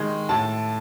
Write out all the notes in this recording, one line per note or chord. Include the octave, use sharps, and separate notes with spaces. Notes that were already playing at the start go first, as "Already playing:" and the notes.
Already playing: D#3 G#3
A2 A5